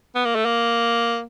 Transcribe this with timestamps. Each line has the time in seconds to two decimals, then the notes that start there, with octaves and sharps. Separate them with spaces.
0.15 B3
0.25 A#3
0.35 A3
0.45 A#3